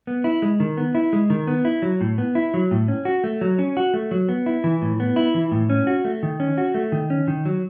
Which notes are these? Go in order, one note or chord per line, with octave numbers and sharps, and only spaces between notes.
B3
E4
G#3
D#3
B3
E4
G#3
D#3
B3
E4
F#3
A2
B3
E4
F#3
A2
C#4
F#4
A3
F#3
C#4
F#4
A3
F#3
B3
E4
E3
A2
B3
E4
E3
A2
C#4
F#4
A3
D#3
C#4
F#4
A3
D#3
C#4
D#3
F#3